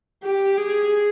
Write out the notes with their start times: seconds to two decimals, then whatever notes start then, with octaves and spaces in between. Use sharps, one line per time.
0.24 G4
0.58 G#4